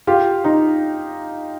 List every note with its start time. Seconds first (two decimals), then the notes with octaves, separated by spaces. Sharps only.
0.07 F4 G4
0.44 D#4 F4